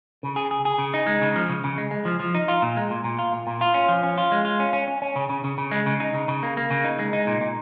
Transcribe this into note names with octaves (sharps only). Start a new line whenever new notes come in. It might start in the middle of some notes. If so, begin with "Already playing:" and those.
C#3
G#4
G#4
G#4
C#3
D#4
G#3
C#3
F3
C#3
C#3
G#3
G#3
F3
F3
D#4
F4
A#2
G#3
A#2
A#2
F4
A#2
A#2
F4
C#4
F3
C#4
F4
G#3
F4
C#4
C#4
C#4
C#4
C#3
C#3
C#3
C#3
G#3
C#3
D#4
C#3
C#3
A#3
A#3
C#3
D#4
G#3
D#4
A#2
A#2